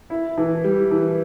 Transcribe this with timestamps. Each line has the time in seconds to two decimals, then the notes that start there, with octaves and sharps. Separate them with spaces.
0.10 E4
0.37 E3
0.64 G3
0.91 E3